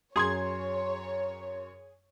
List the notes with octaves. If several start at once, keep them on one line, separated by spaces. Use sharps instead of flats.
F#2 G#4 C#5 C6 G#6